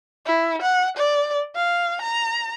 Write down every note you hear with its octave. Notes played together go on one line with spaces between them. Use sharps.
E4
F#5
D5
F5
A#5